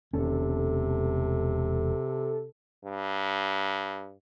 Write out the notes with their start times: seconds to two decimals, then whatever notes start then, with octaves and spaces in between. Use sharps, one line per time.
0.13 E1 C3 C#4 A4
2.85 G2